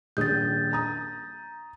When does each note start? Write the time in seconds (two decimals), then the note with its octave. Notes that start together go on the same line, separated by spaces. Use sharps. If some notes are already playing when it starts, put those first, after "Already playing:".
0.17 D#1 A#1 D#6 G6 A6
0.73 A#5 D#6